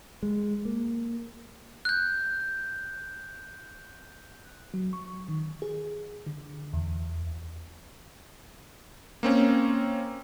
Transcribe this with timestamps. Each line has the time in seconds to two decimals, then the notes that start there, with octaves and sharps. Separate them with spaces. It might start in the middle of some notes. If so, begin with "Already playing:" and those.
0.23 G#3
0.65 A#3
1.85 F#6 G6
4.74 F#3
4.93 C#6
5.28 D#3
5.62 G#4
6.27 D3
6.73 E2
9.23 A#3 C4 C#4